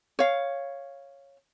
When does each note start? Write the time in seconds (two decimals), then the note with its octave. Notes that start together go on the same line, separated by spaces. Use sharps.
0.19 C#5 F5